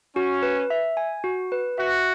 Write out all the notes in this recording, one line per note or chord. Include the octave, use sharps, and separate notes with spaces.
C#4 F#4
B4
E5
G#5
F#4
B4
F#4 E5